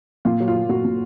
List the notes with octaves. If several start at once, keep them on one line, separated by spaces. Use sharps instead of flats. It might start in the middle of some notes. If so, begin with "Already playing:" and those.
A#2 F4
F#3
F4
F#3
A#2 F#4
A#2